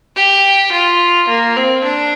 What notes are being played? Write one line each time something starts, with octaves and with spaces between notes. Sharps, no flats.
G4
F4
A#3
C4
D4